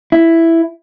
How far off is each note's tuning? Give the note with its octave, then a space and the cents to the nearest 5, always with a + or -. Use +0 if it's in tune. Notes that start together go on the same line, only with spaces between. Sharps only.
E4 +5